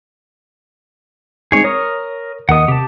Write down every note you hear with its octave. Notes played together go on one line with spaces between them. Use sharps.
G#3 C4 D#4 G#4 C#5
A#4 C#5 D#6
D#2 A#4 D#5 F#5 D#6
C3 G4 A5